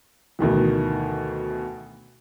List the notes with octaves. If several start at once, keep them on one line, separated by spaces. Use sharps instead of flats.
D2 B2 D#3 E3